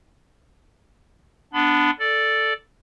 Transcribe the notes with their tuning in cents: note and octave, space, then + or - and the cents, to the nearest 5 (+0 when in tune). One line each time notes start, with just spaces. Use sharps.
B3 +0 D4 +0 B5 +30
A4 +0 D5 +0